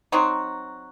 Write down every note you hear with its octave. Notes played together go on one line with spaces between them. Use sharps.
F#3 C4 D#4 F#4